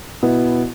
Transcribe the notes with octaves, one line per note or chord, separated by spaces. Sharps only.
B2 B3 E4